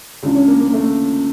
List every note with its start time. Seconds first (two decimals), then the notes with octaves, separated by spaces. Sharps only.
0.22 C#2 C#3 E3 D4
0.35 C#4
0.48 A#3
0.61 A#3
0.74 A3